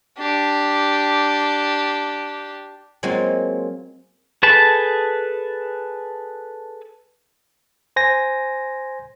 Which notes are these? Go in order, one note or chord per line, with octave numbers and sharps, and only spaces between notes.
D4 G4
F#3 G#3 A#3 C4 F4
G#4 A4 B4 A5
C5 G#5 A#6